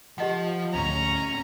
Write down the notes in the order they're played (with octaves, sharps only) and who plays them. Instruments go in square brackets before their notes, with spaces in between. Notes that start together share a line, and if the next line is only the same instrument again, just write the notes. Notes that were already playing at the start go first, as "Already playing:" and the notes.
[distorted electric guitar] F3 A5 [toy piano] G4 D#5 F#5
[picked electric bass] D2 A2 [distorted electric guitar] C#4 [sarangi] A#5